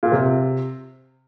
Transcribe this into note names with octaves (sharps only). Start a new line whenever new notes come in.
A#2
C3